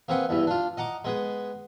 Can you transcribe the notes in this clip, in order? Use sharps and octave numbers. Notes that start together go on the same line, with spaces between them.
A#3 C4 G#4 B4 F#5 G5
E2 G2 E3
D4 F4
D#5 F#5 A#5 D6
G#3 B3 G#4